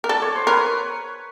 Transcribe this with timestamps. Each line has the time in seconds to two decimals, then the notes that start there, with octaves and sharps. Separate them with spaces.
0.04 A#4
0.09 A4 D5
0.22 C#5
0.35 C5
0.47 A#4 B4 C#5